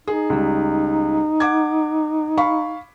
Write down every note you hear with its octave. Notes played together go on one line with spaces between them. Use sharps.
D#4 G#4
C#2 G3
F#5 D6 G#6
F5 B5 C#6